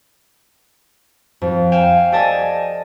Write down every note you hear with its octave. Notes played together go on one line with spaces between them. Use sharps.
F2
F5 G5 G#5 E7
G4 A4 D5 D#5 G#5 A5